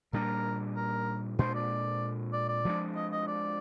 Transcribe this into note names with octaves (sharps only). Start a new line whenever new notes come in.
A#2 G3 A#3 D4 A#4
A#4
A#2 G#3 D4 C5
D5
D5
D5
F3 G#3 D4
D#5
D#5
D5